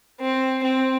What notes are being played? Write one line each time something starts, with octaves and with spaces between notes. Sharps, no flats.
C4
C4